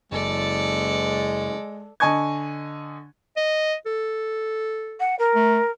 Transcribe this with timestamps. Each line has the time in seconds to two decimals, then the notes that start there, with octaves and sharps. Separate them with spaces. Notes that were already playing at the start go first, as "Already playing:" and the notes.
0.12 F#1 G#3 A4 D5
2.00 D3 D#5 G#5 A5 C#6 G#6
3.37 D#5
3.86 A4
5.00 F#5
5.19 A#4
5.35 A3